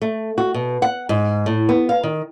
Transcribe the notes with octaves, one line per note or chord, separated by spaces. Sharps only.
A3
F#4
B2
F#5
G#2
A2
B3
F5
D#3